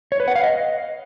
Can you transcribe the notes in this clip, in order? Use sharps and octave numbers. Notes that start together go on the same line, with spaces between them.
C#5
B4
F#5
F5
D#5